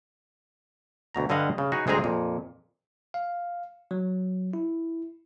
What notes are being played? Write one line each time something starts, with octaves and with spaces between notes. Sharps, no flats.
D2 B2 A#5
G2 D3 G3 D#5 F5 F#5
C#3
D#4 F#4 G#4 B4
D2 G#3 C4 G#4 A#5
F2 A#2
F5
F#3
E4